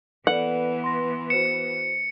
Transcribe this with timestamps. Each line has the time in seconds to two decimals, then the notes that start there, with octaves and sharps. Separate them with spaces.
0.27 E3 B3 A4 B4 D5 F#5
0.84 C6 A#6
1.30 F#4 C5 C#7 E7